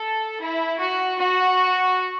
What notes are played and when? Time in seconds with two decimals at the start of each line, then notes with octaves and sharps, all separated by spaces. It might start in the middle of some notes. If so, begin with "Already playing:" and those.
Already playing: A4
0.41 E4
0.80 F#4
1.19 F#4